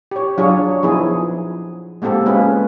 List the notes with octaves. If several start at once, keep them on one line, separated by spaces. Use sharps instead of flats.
G4 C#5
F#3 D4 F4 G#4 C#5
F3 B3 D#4 E4 G#4
G#3 A#3 C4 G4 A4
G#3 A#3 B3 C#4 F4 B4